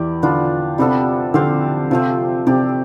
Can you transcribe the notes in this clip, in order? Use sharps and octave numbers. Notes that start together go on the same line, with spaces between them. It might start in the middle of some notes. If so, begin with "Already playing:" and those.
Already playing: E2 E3 E4 G4 D5
D3 B3 D4 F4
C3 G3 B3 D4 A4
D3 C4 G4 C5 F5
C3 F3 A3 C4
C3 C4 G4 D5